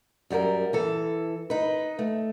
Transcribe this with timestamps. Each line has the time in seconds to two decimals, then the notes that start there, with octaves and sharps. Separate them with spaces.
0.30 F#2 G3 F#4 A#4
0.73 E3 A4
1.50 D#4 B4
1.99 A3